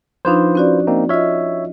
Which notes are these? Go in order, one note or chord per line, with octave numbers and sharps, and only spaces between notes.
F3 D4 D#4 F4 B4 C5
C#4 F#4 D5
A#3 C4 D#4
F4 C#5 D#5 E5